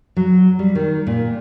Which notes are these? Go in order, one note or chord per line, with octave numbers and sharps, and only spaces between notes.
F#3
G3
D#3
A#2